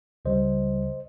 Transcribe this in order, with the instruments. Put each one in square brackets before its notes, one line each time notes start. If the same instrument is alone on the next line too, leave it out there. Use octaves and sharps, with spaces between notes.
[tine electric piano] C#2 C#3 G3 C5 D#5